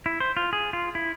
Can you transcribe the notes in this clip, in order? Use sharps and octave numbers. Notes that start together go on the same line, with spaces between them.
E4
C5
F4
G#4
F4
E4